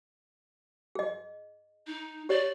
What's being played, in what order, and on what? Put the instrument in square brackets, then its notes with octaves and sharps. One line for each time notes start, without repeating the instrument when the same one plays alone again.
[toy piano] G#4 D#5
[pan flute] D#4
[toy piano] G4 C#5 [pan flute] D5